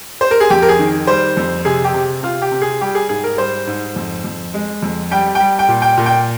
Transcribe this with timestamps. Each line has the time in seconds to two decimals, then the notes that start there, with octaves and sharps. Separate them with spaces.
0.21 C5
0.31 A#4
0.40 G#4
0.50 F2 G4
0.62 A#4
0.69 G#4
0.79 D#3
1.07 G3 C5
1.37 F2
1.65 C3 G#4
1.84 G4
1.94 C3
2.23 C3 F4
2.42 G4
2.52 C3
2.62 G#4
2.81 G3 G4
2.95 G#4
3.09 G#2 G#4
3.24 A#4
3.38 G3 C5
3.67 G#2
3.96 F2
4.24 F2
4.54 G#3
4.83 F2
5.11 G3 G5
5.35 G3 G5
5.59 G5
5.68 A#2
5.82 G5
5.97 A#2
6.06 G5